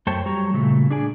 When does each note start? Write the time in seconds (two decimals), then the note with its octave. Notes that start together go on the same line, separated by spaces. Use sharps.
0.07 F#2 A3 C5 C#5 G5 A5
0.25 F#3 G3 C#5 A#5
0.54 A#2 C#3 A3
0.90 D4 G#4 D5 G#5